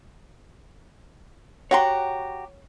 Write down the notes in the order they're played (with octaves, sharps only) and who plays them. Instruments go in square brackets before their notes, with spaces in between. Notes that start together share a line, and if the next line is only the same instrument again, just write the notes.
[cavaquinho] F#4 G4 A#5 [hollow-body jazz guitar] C#5 F#5 C6